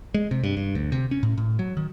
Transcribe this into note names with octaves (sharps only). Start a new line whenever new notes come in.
G#3
C3
G2
G2
D2
C3
C#4
A2
A2
F#3
D#3